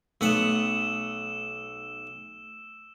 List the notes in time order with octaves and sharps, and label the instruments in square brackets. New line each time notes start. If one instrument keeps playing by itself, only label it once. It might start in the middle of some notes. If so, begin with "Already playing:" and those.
[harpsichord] B1 B3 F#5 [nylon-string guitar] A3 [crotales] E6 E7